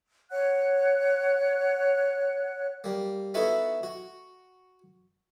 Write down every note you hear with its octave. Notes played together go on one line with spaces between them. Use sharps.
C#5 F#5 F#6
G3 A#3
B3 D#4 E4 F#4 A4 B4
F#4